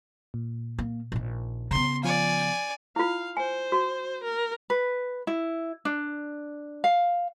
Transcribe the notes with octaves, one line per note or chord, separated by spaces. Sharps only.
A#2
A#3
A#1 D#3
C#3 B3 A#5 C6
F3 D5 F5 G#5
E4 F4 F5
C5 G#5
F#4
A#4
B4
E4
D4
F5